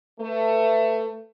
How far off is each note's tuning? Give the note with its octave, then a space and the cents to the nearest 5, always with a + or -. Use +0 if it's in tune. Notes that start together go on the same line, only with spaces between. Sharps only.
A3 +20 B4 +15